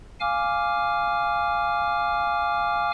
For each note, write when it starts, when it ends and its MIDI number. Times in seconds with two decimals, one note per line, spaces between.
0.20 2.91 77
0.20 2.91 80
0.20 2.91 86
0.20 2.91 89